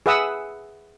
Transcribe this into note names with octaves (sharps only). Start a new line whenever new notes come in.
G#4 B4 E5 F#5 D#6 E6